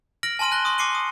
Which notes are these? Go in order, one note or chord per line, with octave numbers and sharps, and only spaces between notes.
F6 A#6 D7 F#7
G#5 A5 C6 F6 D#7
A5 F#6 A#6 G7
C6 C#6 D#6
A5 D6 C7 C#7 D#7 G7
D#6